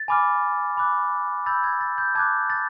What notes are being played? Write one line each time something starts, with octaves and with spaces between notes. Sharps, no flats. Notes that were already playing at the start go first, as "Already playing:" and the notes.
Already playing: A6
G#5 B5 D6 F6
B5 D6 F#6
B5 E6 G6 A6
G#6
A6
G6
A5 D6 F#6 G#6
A6